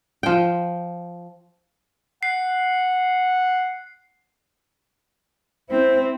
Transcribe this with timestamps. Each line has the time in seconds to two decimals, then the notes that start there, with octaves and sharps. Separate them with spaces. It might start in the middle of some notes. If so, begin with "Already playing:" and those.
0.23 F3 G5
2.23 F#5 C7
5.70 C4 E4 C5